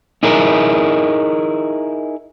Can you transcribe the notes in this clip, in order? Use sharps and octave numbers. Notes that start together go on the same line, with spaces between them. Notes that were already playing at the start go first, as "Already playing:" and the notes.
D#4 E4 G#4 A#4